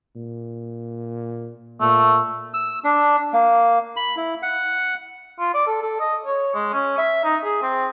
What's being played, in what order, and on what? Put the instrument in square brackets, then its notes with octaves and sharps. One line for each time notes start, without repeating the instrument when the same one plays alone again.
[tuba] A#2
[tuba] A#2 [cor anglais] A3
[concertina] E6
D4
A#3
B5
E4
F#5
[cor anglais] F4
D5
A4
A4
D#5
C#5
G#3
C#4
E5
D#4
G#4
C4